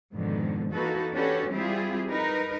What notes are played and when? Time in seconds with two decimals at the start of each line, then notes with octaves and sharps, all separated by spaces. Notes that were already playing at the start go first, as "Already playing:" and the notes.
0.13 F2 G#2 B2 D3 D#3
0.71 E3 A#3 D#4 F#4 A4 B4
1.13 C#4 D4 F#4 G4 A4 B4
1.51 G3 C4 E4 F4 G4 G#4
2.09 D#4 A#4 B4